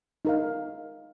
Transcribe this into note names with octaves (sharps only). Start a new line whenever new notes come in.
D#4 A#4 F5